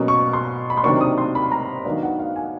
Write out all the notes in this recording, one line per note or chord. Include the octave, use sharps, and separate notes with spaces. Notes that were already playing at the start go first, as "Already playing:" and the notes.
Already playing: B2 F#3 A#3 C#4
C#6
C6
B5
C6
C3 D#3 F#3 A#3 D4 C#6
D#6
C6
B5
A#5
D#3 F#3 B3 D4 F5
F#5
F5
G#5